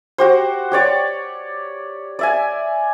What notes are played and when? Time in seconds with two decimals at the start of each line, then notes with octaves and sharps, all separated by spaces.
0.18 F#4 G4 C5
0.72 G4 C#5 D5 C#6
2.19 D5 E5 G#5